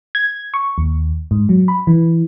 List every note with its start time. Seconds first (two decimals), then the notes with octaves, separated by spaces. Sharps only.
0.15 G#6
0.54 C#6
0.78 D#2
1.31 G#2
1.49 F#3
1.68 B5
1.87 E3